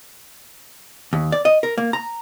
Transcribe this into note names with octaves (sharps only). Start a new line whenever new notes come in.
D#2
D5
D#5
A#4
A#3
A#5